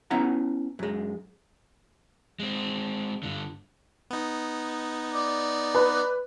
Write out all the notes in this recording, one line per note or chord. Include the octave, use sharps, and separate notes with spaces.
B3 C#4 E4 F#5 A#5
F#2 G#3
G#3 C4
G2 D3
B3 D#4
D5
B4